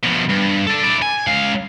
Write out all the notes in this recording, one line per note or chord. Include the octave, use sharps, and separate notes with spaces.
B2 F3
G2
A4 D5
E4 D5
G#5
C#2 F5